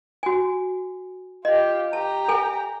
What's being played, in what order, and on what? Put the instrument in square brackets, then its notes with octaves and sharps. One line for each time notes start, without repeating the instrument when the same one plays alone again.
[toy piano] F#4 G#5
[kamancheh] F4 G4 [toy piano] D#5
[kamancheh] G4 A#5 [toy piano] A5
[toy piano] A4 G#5